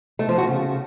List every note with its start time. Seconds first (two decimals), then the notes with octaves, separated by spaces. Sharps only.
0.19 A3
0.29 F3
0.38 F#4
0.47 C#3